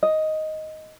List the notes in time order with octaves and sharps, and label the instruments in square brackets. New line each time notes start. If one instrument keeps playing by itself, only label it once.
[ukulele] D#5